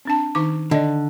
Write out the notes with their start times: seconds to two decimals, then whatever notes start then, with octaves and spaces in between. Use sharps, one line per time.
0.05 C4 D4 A5
0.35 D#3 D#4 D6
0.71 D3 D5 D#5